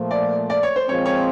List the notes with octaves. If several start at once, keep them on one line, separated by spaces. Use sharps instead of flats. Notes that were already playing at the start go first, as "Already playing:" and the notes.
Already playing: A#2 F3 A3
D5
D5
C#5
C5
A#2 F3 G#3 C4 C#5
C#5